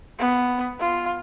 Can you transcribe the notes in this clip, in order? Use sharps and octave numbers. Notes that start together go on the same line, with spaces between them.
B3
F4